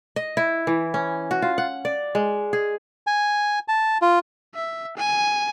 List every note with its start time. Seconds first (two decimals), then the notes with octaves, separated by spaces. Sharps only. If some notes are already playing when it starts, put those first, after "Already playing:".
0.16 D#5
0.37 E4
0.67 E3
0.94 C#4
1.31 F#4
1.42 F4
1.58 F#5
1.85 D5
2.15 G#3
2.53 G#4
3.07 G#5
3.68 A5
4.02 F4
4.55 E5
4.97 G#5